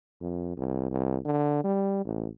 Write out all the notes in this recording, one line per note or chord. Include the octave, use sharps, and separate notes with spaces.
F2
C2
C2
D3
G3
A1